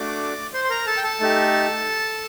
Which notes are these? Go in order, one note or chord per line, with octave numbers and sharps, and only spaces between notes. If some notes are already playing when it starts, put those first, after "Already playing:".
Already playing: A3 D4 F#4 D5 D6
C5 C6
C6
A#4 A#5
A4 A5
G5
A4 A5
A3 D#4 G4